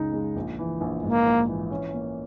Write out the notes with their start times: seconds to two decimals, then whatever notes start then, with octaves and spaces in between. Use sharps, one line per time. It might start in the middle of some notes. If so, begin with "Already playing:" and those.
Already playing: C#2 C#3 G#3 D#4
0.13 G#3
0.36 A#1
0.59 E3
0.81 A#1
1.03 G#2 A#3
1.25 A#1
1.48 E3
1.71 C#4
1.93 A#3